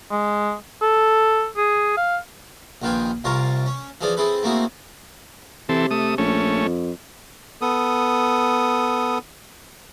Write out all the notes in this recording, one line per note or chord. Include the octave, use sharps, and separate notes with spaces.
G#3
A4
G#4
F5
A#1 D#3 F4 B4 G5 G#5
C2 C3 F4 A#4 C#5 A5
C#4
E3 F3 G#4 A4 D5
C4 E4 G#4 A4 B4
A3 A#3 C4 E4 F#4 G#4
C3 E3 C4 A4
A3 D#6
A#1 A3 C#4
F2
B3 A4 D#6